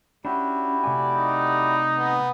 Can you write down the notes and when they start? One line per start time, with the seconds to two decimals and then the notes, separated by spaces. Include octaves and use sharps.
0.25 C#4 D4 E4 F#4 G4
0.84 C3 A3 D5 G#5
1.16 D#4
1.97 B3